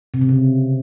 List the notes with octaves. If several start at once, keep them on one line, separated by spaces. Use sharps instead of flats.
C3
C#3
C3